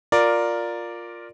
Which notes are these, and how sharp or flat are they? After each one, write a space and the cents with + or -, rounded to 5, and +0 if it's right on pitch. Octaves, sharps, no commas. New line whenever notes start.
F4 +10 A#4 +0 D5 +0